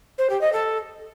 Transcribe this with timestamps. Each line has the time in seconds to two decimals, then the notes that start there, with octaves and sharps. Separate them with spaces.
0.18 C5
0.30 G4
0.41 D#5
0.53 A4